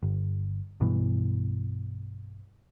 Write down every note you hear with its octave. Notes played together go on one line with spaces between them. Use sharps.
G1
B1 G2 B2 E3